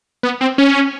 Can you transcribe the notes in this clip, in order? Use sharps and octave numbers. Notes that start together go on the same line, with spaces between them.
B3
C4
C#4